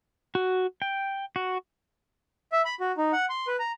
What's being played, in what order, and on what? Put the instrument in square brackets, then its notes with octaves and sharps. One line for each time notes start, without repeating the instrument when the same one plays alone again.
[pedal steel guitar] F#4
G5
F#4
[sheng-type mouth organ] E5
B5
F#4
D#4
F#5
C6
B4
A#5